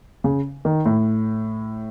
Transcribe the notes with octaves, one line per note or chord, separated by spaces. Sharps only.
C#3
D#3
A2